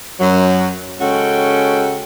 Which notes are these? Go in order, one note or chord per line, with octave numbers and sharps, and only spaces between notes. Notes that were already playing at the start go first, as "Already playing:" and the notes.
F#2 F#3
C#3 G#3 C#4 F#4 A4 G5